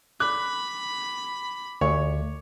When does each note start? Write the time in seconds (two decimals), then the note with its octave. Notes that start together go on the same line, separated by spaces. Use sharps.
0.20 B5 D6 F#6
1.81 D2 C#5